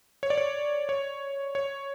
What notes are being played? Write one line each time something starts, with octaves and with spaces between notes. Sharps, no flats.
C#5
D5
C#5
C#5
C#5